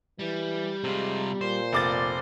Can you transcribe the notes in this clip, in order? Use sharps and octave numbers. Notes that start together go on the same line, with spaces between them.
E3 G3
C3 G#3 F4
A#2 C5
F1 D6 A6